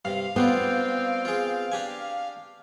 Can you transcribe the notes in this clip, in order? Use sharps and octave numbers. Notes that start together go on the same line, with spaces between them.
G2 C3 F5
G3 B3 C4 D4 F4
F4 G#4
D4 G4 G#5